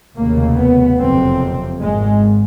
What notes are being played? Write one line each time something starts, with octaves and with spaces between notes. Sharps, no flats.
F1 D#2 C#3 A#3
B3
F#1 F2 C3 C4
G#1 G#2 G#3